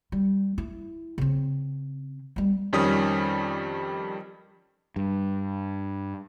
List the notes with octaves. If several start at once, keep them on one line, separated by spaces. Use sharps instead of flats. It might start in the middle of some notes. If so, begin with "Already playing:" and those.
G3
E4
C#3 C4
G3 B3
F2 D#3 G3 C#4 D#6 B6
G2